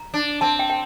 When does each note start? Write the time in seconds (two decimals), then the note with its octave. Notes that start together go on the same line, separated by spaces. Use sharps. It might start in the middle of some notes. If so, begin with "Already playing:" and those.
Already playing: A#5
0.14 D4
0.41 C4 A5
0.59 G5
0.70 G5